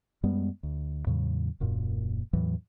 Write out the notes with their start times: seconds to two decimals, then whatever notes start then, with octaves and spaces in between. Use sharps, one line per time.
0.23 F#2 G3 G#3 B3
0.63 D2
1.07 E2 A2 C#3 F#3
1.60 D#1 F#2 A#2
2.33 E2 A2 E3 F#3